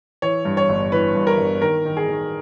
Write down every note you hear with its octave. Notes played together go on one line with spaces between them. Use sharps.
E3 C#5
G2
C#5
G1
E3 B4
G2
A#4
G1
D#3 A#4
D#3
G#4
D#3